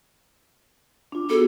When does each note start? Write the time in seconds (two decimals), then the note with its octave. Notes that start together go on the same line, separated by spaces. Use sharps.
1.12 D4 F4
1.30 B3 F#4 G#4 A4